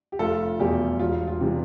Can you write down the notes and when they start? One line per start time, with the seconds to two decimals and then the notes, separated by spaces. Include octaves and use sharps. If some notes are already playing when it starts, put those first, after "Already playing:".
0.12 G4
0.19 F1 F4 A4
0.60 E2 B2 G3 G4
0.99 E1 F4
1.27 F4
1.40 C3 E3 G3